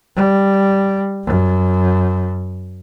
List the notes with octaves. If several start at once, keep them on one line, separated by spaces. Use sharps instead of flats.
G3
F#2